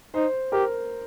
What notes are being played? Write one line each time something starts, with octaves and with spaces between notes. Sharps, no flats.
D#4 C5
G4 A#4